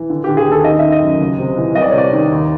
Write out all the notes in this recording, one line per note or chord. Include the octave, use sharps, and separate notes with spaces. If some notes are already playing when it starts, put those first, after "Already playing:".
Already playing: E3
D3
D3 G4
G#4
D#2
A4
D#3 D#5
D#3 E5
D#5
F#2
C#2
C3
E3
C2 D#5
D5
C#5
C3 D5
D#3
D#2